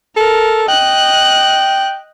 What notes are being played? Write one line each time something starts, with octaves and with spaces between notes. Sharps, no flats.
A4 A#4
D#5 G5 F#6